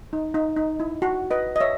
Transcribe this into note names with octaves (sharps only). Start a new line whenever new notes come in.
D#4
D#4
D#4
E4
F#4
B4 D#5
D#5
C#5 E5